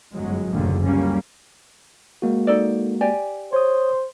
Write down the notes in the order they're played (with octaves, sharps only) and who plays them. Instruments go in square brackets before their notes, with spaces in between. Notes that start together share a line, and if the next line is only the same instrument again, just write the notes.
[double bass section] G1 F#2 F#3 G#3
F#1 D#2 A#2 D3 D#3 A3
C#2 F#2 G3 A#3 C#4
[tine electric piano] G#3 A#3 F#4
[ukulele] D#4 A4 D5
G4 D5 G#5
[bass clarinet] C5 [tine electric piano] C#5 D#6